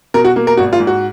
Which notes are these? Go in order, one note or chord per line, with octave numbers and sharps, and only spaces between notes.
B2 A#4
F#4
A#3
A#4
G#1 F#4
F4
G#2
F#4